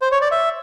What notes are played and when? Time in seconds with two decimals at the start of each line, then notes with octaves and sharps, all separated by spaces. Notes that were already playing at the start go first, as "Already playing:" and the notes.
0.02 C5
0.12 C#5
0.22 D5
0.31 E5